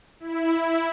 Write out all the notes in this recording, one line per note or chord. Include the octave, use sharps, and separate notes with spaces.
E4